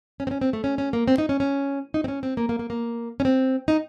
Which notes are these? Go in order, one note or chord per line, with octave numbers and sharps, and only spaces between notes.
C#4
C4
C#4
C4
A3
C#4
C#4
A#3
C4
D#4
C#4
C#4
D#4
C4
C#4
C4
A#3
A#3
A#3
A#3
C#4
C4
D#4